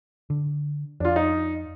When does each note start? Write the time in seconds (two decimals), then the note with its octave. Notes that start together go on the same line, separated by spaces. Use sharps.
0.30 D3
1.00 F2 D4 F4
1.16 D#4